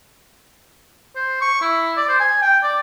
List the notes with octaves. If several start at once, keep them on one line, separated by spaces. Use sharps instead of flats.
C5
C#6
E4
D5
C5
G#5
G5
D5